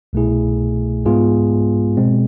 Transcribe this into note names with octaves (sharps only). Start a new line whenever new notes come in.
C2 B2 A3 E4 G#4
G#2 G#3 B3 F4 G#4
B2 G#3 C4